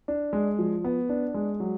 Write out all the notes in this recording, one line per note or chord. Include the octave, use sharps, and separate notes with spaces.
D4
G#3
F3
B3
D4
G#3
F#3